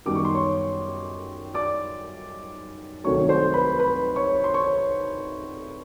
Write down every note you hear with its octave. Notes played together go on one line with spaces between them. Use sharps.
F#2 D#3 G3 B3 D#4 D6
C#6
C6
C#5 C#6
D5 D6
C2 C3 D#3 F#3 A3 C#5 C#6
C5 C6
B4 B5
B4 B5
C#5 C#6
C6
C#5 C#6